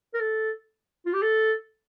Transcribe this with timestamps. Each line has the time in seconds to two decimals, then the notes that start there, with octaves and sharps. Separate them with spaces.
0.14 A#4
0.20 A4
1.06 F4
1.13 G4
1.22 A4